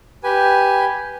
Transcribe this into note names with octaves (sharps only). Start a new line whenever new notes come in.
G4 B4 G#5